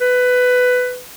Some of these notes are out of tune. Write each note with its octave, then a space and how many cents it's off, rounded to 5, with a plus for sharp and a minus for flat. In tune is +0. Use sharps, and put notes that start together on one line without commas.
B4 +15